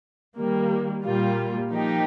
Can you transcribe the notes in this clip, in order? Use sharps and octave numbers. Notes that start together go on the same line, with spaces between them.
D#3 G3 A#3
A#2 G3 A#3 F4
F3 A#3 D#4 G4